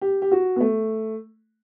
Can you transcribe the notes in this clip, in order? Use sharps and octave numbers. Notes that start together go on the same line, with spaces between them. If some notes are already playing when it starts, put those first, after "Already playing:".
G4
G4
F#4
B3
A3